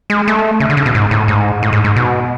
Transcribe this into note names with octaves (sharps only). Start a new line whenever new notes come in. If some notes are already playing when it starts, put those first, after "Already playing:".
G#3
A3
C#3
D3
C#3
B2
G#2
A2
G#2
A2
G#2
G#2
B2